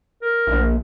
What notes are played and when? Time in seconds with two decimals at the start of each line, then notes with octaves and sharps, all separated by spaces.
0.22 A#4
0.47 A#1